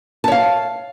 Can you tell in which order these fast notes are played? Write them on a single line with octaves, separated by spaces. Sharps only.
A5 C#5 F5